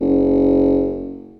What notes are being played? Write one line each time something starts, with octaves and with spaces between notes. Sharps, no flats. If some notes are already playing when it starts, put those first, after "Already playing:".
F#1